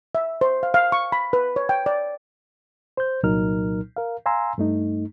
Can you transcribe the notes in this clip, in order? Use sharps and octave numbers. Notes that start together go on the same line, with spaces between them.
E5
C5
F5
F5
C#6
B5
B4
C#5
G5
D5
C5 G6
C2 A#2 F#3 D#4 A#4 F6
A#4 F5
F5 G#5 A#5 C6 E6
G2 A3 D#4